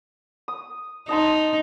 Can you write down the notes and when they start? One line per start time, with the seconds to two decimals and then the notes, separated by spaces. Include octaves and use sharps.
0.48 D#6
1.09 D#4 D#5 A5 C6